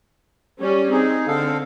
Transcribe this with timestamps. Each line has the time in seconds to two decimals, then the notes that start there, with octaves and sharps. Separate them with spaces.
0.60 G3 C#4
0.91 C4 D#4 G#4
1.27 D3 C4 A4 F5